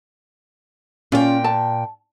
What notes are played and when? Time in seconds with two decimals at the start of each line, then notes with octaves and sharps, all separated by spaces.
1.12 A#2 C#4 F4 G5
1.44 A5